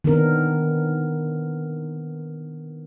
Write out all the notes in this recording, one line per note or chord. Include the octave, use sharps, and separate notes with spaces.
D#3 B3 C4 D4 A#4